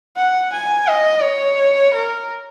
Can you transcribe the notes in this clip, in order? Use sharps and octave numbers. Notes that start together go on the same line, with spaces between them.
F#5
G#5
D#5
C#5
A#4